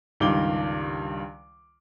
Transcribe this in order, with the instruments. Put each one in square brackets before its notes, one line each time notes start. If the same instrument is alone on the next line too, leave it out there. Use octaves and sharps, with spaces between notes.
[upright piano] C#2 G2 D#3 F5 D6 G7